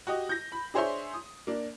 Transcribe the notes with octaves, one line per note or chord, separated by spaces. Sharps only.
F#4 G4 D#5
G6 A#6
B5
D4 G#4 C5 C#5 E5 C6
D#6
A#3 D4